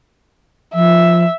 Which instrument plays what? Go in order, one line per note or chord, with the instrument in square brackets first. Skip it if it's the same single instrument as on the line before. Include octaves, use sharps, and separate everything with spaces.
[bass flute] F3 [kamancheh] E5